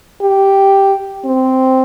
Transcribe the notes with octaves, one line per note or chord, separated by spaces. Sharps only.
G4
C4